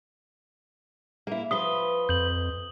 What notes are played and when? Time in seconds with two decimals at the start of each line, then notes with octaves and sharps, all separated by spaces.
1.27 A#3 E4
1.51 F3 B4 D#6 G7
2.09 F2 G6 F#7